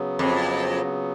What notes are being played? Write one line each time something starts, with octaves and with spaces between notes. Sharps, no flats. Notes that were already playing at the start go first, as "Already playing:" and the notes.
Already playing: C#3 F#3 B3
F2